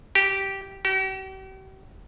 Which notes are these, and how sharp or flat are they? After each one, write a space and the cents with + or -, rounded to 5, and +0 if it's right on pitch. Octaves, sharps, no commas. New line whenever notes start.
G4 -10
G4 -45